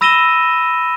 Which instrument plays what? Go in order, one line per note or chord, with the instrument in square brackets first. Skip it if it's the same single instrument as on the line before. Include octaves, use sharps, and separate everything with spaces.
[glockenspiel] B5 E6 A#6 D#7 E7 G7